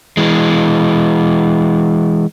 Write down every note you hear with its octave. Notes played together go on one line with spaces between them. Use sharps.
E3 G#3